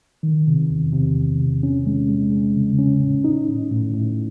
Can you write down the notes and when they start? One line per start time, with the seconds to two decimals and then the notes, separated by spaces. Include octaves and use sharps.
0.23 D#3
0.47 C3
0.70 E2
0.93 C3
1.17 E2
1.40 C3
1.63 C#4
1.86 G#3
2.09 G#3
2.32 G#3
2.56 C#3
2.78 C#4
3.01 A2
3.24 D#4
3.48 A2
3.71 A2
3.94 A2